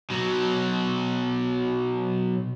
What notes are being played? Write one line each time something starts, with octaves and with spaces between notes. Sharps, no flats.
B2 F#3